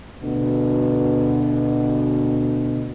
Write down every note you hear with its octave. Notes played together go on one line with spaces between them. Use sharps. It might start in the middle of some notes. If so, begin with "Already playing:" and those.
D2 B2